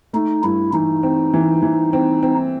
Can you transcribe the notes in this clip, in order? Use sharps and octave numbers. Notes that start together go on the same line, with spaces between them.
A3 D#4
G2 E4
E3 D#4
C4
E3
E3
C4
C4